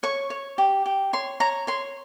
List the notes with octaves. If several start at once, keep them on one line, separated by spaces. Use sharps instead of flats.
C#5 C#6
C#5
G4
G4
C#5 C6
C#5 A#5
C#5 C6